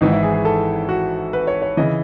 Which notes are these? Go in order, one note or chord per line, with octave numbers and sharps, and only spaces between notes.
G#1 G#2 E3 D#4
E4
G#4
G#4
A4
F#4
B4
C#5
C#5
C#3 E3 D#5